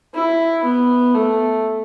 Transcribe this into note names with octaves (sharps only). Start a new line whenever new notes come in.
E4
B3
A3